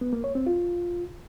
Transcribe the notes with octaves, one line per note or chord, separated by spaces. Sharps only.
B3
A#3
C#5
C4
F4